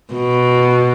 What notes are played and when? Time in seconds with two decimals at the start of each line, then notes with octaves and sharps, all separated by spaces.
0.14 B2